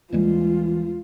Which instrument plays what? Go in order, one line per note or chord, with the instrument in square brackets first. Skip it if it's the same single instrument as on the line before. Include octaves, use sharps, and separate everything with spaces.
[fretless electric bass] D#2 G3 G#3 [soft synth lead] E3 [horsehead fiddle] F4